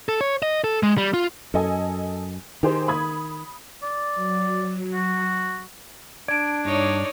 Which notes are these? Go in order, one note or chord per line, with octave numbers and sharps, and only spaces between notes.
A4
C#5
D#5
A4
G#3
G3
F4
F#2 A4 D#5 G#5
D#3 G4 G#4 C5
B5 D#6 G#6
D5
F#3
F#4
D4 D5 A5 G#6 D7
G2 D#4 C#5 D5